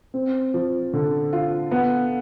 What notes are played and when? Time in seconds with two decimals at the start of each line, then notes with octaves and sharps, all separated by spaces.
0.14 C4
0.54 F3
0.93 D3
1.33 F4
1.71 B3